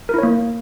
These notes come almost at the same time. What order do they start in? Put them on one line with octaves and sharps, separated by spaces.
A#4 E4 C#5 A#3